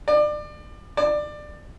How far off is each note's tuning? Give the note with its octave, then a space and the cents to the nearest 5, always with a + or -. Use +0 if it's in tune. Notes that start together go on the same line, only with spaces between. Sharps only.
D5 +30
D5 +20